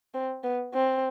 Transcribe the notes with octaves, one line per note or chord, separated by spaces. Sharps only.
C4
B3
C4